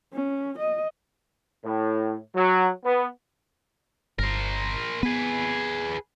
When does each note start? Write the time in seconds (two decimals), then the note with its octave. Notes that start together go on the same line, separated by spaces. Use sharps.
0.13 C#4
0.58 D#5
1.64 A2
2.34 F#3
2.84 B3
4.19 G1 A#4 C5
5.03 B3 G#4 B4